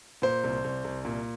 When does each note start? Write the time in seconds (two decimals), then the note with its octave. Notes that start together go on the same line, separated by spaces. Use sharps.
0.22 A#2 C5
0.44 C2
0.64 C2
0.84 C2
1.05 A#2